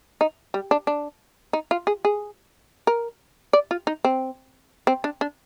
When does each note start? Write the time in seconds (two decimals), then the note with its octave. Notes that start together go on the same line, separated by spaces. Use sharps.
0.21 D#4
0.54 G3
0.71 D4
0.87 D4
1.53 D#4
1.71 F4
1.87 G#4
2.05 G#4
2.87 A#4
3.53 D5
3.71 F4
3.87 D#4
4.05 C4
4.87 C4
5.04 D4
5.21 D4